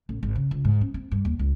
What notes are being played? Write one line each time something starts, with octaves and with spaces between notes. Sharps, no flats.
A1
G#1
C#3
C#2
G#2
C#4
C4
G2
D#2
C#2